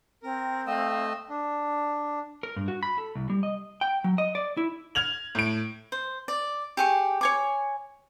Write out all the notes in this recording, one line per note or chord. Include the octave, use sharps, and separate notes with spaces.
C4 A#4
A3 D#5 F5 E6
D4
A#4
G2
F#4
B5
A4
C2
G3
D#5
G5
F#3
D#5
D5
E4
F6 G#6 F7 F#7
A2 D7
C5
D5
G4 G#4 C#6
C#5 G#5 D6